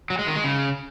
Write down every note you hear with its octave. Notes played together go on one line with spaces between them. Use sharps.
F#3
G#3
D#3
G#3
C#3